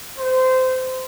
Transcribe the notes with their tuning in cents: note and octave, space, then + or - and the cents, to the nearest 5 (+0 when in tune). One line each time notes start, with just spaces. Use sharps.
C5 -20